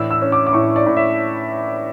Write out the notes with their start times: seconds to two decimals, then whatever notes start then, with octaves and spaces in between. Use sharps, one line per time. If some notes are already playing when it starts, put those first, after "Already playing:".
Already playing: A2 E3 D4 E6
0.11 E6
0.21 C#4
0.32 D6
0.47 D6
0.53 A2 C#6
0.76 D5
0.86 A2
0.96 E5